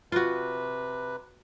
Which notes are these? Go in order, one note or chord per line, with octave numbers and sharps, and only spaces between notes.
C3 F4 F#4 B4